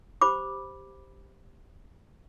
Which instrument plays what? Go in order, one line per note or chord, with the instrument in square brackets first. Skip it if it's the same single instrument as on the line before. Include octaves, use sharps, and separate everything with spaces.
[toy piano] G4 C5 B5 D6